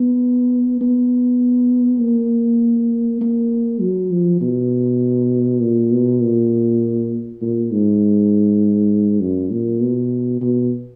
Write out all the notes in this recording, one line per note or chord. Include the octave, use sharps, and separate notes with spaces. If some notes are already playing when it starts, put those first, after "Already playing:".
Already playing: B3
B3
A#3
A#3
F#3
F3
B2
A#2
B2
A#2
A#2
G#2
F#2
A#2
B2
B2